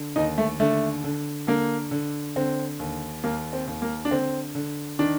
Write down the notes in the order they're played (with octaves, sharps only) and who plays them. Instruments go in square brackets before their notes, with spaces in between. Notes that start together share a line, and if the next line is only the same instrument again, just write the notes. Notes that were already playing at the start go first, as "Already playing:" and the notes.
Already playing: [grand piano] D3
D#2 D#4
A3
D3 A3
D3
D3 A#3
D3
D3 C4
D#2
D#2 A#3
C4
D#2
A#3
D4
D3 C4
D3
D#3 D4